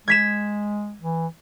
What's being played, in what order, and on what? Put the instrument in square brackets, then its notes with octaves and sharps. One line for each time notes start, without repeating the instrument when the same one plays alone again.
[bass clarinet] G#3 [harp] G#6 B6 E7
[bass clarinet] E3